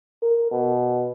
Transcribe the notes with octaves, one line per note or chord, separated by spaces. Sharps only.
A#4
B2